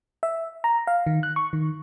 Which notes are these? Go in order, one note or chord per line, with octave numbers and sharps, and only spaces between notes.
E5
A#5
F5
D#3
F#6
C#6
D#3